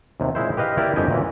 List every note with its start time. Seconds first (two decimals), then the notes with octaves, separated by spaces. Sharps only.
0.20 D#2 C3
0.35 A#2 G#3 E4 C5
0.57 G4 B4 D#5 F5
0.77 A#3 E4 G4 A#4 D5
0.96 G1 F2 G4 D#5 G5 G#5
1.09 F#2 A#2 E3